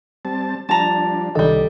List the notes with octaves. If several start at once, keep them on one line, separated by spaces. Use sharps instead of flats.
G3 C4 A5
F3 G3 D4 A5 A#5
C2 D#3 G3 D4 A4 D#5